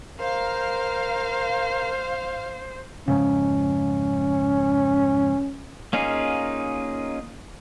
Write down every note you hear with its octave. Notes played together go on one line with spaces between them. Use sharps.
A#4 C5 F5
F2 G#2 C#3 C#4
A#3 C#4 D#4 F4 G#4